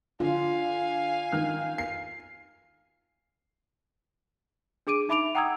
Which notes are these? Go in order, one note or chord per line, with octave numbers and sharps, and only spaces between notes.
D3 F4 F5 G#5
D#3 F6
C7
D4 G#4 D6 D7 D#7
D#4 E5 B5 D6 D7 F7
F#5 G5 A#5 D#6 E6 G#6